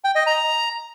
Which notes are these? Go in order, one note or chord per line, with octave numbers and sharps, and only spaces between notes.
G5
D#5
A#5